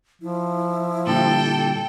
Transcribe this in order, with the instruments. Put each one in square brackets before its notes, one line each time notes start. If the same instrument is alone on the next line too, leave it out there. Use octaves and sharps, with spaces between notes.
[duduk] F3 [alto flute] E4
[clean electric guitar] A#2 D3 G3 [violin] A4 G5